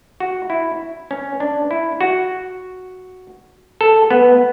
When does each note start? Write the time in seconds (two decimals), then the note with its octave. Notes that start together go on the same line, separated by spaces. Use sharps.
0.20 F#4
0.50 E4
1.11 C#4
1.40 D4
1.71 E4
2.01 F#4
3.81 A4
4.11 B3